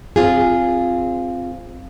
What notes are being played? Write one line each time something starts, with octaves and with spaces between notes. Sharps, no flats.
C4 F4 G#4